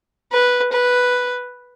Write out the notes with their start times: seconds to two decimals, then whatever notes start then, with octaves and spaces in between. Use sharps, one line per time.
0.32 B4
0.73 B4